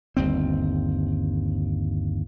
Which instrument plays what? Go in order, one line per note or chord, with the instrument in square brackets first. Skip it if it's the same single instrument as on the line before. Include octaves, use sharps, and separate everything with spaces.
[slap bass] G1 D#2 C4